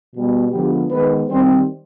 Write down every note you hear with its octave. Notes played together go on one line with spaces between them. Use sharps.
B2 G3 B3
D3 F3 G#3 B3 G4
D#3 G#3 B3 B4
D#3 G3 C4 C5